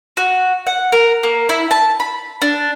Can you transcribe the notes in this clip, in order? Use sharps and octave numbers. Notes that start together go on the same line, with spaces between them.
F#4
F#5
A#4
A#3
E4
A5
B5
D4